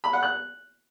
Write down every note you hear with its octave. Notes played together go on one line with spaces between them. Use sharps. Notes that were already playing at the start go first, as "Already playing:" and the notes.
B5
F#5
F#6